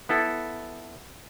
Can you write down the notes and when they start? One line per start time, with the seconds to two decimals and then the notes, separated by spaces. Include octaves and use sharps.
0.09 B3 E4 A4